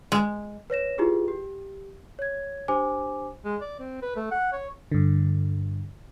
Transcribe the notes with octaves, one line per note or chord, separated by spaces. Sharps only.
G#3
B4 C#5 A#6 E7
E4 F4 G4 G#4 B4
G4
C#5 G#6
D4 G4 C5 G#5 D6
G#3
D5
C4
B4
A3
F#5
C#5
G2 D3